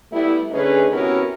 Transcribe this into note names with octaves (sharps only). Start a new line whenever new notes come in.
G3 A3 B3 E4
D3 A3 C#4 D#4 G#4 B4
C3 B3 C#4 E4 F#4 A#4